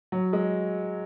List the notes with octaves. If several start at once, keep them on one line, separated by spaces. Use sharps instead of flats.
F#3
G#3